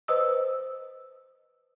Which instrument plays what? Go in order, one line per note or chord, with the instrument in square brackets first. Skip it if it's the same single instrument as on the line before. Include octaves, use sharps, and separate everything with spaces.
[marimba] B4 C5 D#5 D#6 E6